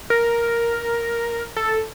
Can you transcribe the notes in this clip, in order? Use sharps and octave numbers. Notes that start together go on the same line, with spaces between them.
A#4
A4